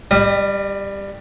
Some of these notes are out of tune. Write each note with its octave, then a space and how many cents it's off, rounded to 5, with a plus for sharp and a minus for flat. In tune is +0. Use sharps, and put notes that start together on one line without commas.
G3 +15 D#5 -30